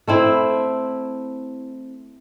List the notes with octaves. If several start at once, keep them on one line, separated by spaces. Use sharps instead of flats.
A3 C4 E4